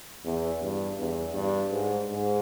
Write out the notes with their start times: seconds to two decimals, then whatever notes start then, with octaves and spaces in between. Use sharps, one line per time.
0.25 E2
0.62 G2
0.98 E2
1.34 G2
1.71 G#2
2.09 G#2